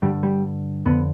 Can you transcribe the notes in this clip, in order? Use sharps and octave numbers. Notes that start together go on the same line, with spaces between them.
G2 D3 G3
G3
F2 D3 B3